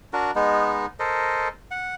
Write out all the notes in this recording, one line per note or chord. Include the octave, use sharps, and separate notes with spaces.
D4 F#4 A#4
G#3 B3 D#4
A4 A#4 C5 D#5
F#5